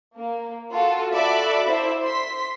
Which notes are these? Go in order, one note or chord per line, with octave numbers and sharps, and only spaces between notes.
A#3
F4 F#4 A4
F#4 A4 D5 E5 B5 D6
E4 C5 E5
C6 B6